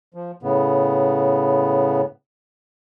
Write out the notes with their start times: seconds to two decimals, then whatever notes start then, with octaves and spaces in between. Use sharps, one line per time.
0.14 F3
0.43 A2 C#3 B3